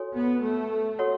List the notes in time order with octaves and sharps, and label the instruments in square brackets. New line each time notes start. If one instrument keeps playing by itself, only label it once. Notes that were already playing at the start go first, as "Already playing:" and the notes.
Already playing: [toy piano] F#4 A4 C#5 G#5
[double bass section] B3
A3
[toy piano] F#4 A4 C#5 F#5